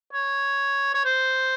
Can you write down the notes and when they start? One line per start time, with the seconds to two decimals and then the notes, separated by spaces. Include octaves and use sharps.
0.13 C#5
0.94 C#5
1.05 C5